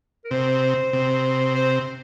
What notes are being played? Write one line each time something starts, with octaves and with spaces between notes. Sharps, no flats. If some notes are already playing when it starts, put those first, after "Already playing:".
A#4
C3 C5
C3
C5